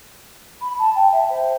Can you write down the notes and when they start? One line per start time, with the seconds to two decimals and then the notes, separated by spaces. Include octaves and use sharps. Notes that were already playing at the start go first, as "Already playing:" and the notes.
0.62 B5
0.79 A5
0.95 G5
1.12 E5
1.30 C5